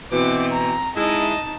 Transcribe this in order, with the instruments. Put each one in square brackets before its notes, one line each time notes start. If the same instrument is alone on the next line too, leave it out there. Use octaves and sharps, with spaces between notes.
[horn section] B2 E3 [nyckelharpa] C4 [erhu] D6
[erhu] A#5
[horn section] G#3 E4 [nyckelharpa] D#4 A5 [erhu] D#5